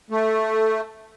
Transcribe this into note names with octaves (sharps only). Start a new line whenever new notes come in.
A3